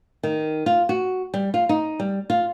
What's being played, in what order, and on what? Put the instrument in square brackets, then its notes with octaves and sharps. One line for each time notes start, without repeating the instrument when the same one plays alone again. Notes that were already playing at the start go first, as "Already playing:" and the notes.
[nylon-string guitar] D#3
F4
F#4
G3
F4
D#4
G3
F4